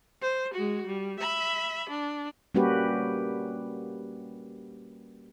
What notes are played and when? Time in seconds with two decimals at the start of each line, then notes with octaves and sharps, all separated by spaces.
0.22 C5
0.54 G#3 F#4
0.86 G3
1.19 E5 B5
1.89 D4
2.55 G3 A#3 C#4 F#4 G4 B4